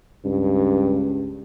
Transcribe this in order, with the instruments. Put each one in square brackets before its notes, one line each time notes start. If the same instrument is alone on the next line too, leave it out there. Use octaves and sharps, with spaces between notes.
[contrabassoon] C#2 [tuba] G2